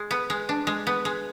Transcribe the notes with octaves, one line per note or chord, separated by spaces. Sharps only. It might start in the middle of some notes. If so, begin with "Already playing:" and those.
Already playing: G#3
B3
G#3
D4
G#3
B3
G#3